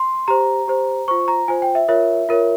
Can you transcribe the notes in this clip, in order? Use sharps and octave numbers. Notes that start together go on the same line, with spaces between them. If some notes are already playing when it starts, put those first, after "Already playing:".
Already playing: C6
G4 C5 A#5
G4 C5
F4 C5 C#6
A#5
F4 C5 G#5
G5
E5
F4 A#4 C#5 E5
F4 A#4 C#5